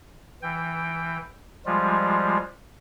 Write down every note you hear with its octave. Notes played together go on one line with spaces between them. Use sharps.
E3 G5
F3 G3 G#3 F4